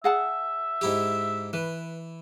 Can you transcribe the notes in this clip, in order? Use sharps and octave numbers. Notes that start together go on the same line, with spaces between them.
G#4 E5 F#5 A5
G#2 E4 G4
E3 B4